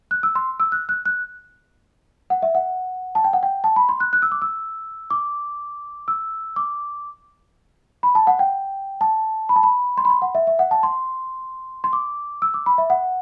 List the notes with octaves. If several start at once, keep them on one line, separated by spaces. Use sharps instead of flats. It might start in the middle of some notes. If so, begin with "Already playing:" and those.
F#6
E6
C6
E6
F#6
F#6
F#6
F#5
E5
F#5
A5
G5
F#5
G5
A5
B5
C6
F#6
F#6
E6
D6
E6
D6
E6
D6
B5
A5
F#5
G5
A5
B5
A5
B5
C6
B5
C6
F#5
E5
E5
F#5
A5
C6
C6
D6
E6
D6
B5
E5
F#5